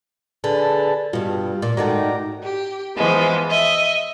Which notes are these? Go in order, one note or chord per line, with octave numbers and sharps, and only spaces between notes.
D3 G#4 B4 A5
G2 B2 G3 F4
A#2
G#2 D#3 A3 F#4 D5 A#5
G4
E3 F3 G#3 B3
D#5 E5